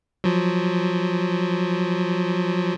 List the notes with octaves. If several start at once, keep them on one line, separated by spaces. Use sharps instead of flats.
F3 F#3